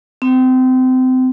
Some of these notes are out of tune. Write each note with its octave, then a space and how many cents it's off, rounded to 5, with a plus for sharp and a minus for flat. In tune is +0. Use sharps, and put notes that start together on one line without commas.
C4 -30